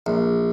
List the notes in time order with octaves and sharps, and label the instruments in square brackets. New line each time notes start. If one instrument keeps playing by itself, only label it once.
[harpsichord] A#1